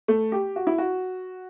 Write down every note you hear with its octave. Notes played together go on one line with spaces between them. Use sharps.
A3
G4
F#4
E4
F#4